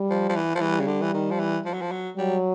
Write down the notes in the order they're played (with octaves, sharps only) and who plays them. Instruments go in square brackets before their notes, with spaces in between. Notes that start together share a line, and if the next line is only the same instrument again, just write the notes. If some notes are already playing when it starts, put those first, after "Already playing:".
Already playing: [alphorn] G3
[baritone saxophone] F3
F3
E3
F3
[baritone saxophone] E3 [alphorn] G3
[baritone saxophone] C#3
D3
E3
D#3
F3
E3
F3
F#3
F3
F#3
[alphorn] F#3 [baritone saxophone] G3